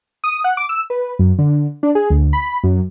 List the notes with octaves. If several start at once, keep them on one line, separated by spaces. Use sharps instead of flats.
D#6
F#5
D6
E6
B4
F#2
D3
D4
G#4
D2
B5
F#2